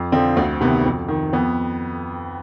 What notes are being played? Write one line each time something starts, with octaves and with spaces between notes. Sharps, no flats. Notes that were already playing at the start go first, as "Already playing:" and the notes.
Already playing: F2
D3 F3 C4
D2 C4
C3 D#3 B3
F2
D#3
F2 B3